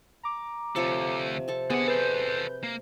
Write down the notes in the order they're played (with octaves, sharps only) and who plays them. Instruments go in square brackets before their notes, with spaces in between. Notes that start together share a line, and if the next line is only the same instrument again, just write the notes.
[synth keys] A#5 D6
[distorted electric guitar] D2 A4 [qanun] C3 F3 C#5
[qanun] C4 A4 A5
[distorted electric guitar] D3 F#5 [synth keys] B3 [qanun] G#4
[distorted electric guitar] A4 C5 [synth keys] B4 G6
[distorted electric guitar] A#3